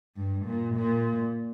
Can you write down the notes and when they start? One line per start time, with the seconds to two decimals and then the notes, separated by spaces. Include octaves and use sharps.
0.16 G2
0.46 A#2
0.75 A#2